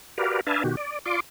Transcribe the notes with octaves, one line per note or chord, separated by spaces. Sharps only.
F#4 G4 A#4 B4 D5 F5
D4 B4 E5 F5 G#5 A5
B2 D#3 F#4 G4
D5
F4 D5 C6 D6